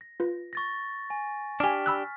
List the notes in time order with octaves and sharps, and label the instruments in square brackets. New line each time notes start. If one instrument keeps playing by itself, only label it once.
[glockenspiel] A#6
[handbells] F4 B4
[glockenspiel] C#6 A6 A#6
G#5
[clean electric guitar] D4 G4 [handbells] G#5 D6 [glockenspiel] F6 B6
[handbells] B5 E6 F#6